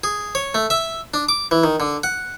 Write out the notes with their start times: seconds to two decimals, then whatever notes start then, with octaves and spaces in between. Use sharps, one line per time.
0.04 G#4
0.35 C#5
0.55 A3
0.70 E5
1.14 D4
1.29 D6
1.51 E3
1.64 D#3
1.80 D3
2.04 F#5